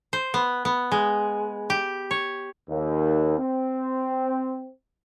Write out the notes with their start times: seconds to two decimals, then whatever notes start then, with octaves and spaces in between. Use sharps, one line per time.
0.13 C5
0.34 B3
0.65 B3
0.92 G#3
1.70 G4
2.11 C#5
2.69 D#2
3.38 C4